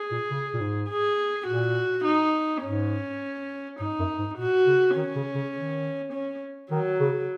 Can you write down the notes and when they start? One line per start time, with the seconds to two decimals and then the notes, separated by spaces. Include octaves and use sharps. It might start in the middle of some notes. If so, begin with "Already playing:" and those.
Already playing: G#4
0.11 A#2
0.30 C#3
0.54 A#2
0.60 G#2
0.89 G#4
1.47 A#2 F#4
2.05 D#4
2.63 G#2 C#4
3.79 G#2 D#4
3.99 F#2
4.18 G#2
4.38 A#2 F#4
4.67 C#3
4.96 D#3 C#4
5.16 C#3
5.35 C#3
5.54 D#3
6.13 C#4
6.71 D#3 F#3
7.00 C#3